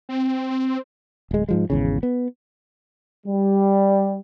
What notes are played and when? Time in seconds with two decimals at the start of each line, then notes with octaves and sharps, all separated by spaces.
0.09 C4
0.50 C4
1.31 D1 G#3
1.49 G#2 F3 G#3
1.70 G#1 E2 C#3
2.03 B3
3.26 G3